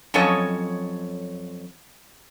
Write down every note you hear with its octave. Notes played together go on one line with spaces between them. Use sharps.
F2 F#3 C#4 A4 C#5 D#5